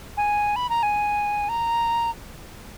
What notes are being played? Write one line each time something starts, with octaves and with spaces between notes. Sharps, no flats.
G#5
B5
A#5
G#5
A#5